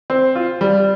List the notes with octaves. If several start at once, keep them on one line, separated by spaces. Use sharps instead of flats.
C4
F4
G3